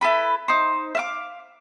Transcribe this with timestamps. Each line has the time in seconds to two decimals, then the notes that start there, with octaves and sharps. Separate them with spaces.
0.01 E4 A4 B4 B5
0.48 D#4 C5
0.95 E5 F5 D6